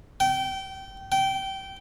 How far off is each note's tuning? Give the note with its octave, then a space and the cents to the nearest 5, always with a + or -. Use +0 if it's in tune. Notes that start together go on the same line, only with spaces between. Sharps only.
G5 -25
G5 -20